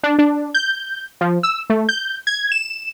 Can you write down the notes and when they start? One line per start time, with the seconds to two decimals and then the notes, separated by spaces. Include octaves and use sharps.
0.03 D4
0.19 D4
0.54 G6
1.21 F3
1.43 E6
1.70 A3
1.89 G6
2.27 G#6
2.52 E7